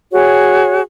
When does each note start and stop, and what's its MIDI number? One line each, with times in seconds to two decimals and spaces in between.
0.12 0.81 66
0.12 0.81 68
0.12 0.81 73